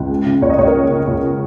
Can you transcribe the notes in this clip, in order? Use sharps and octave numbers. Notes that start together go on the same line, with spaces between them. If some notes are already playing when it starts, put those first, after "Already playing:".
Already playing: C#2
G#3
C#3
C#2 C#5
D#5
C#2 C#5
A#4
G#3
C#3
C#2